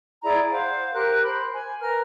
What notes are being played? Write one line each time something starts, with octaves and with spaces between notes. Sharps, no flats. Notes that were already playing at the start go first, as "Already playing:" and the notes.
E4 G#4 D5 A#5
C5 F5 F#5
G4 A#4 F#6
C5 B5
G#5
A#4 B4 A#5 F6